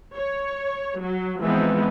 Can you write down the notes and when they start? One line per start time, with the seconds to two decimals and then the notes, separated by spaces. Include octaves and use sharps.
0.15 C#5
1.01 F#3
1.43 E3 F3 G#3 B3 C4 D#4